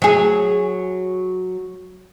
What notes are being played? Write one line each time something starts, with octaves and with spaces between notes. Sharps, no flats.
F#3 G#4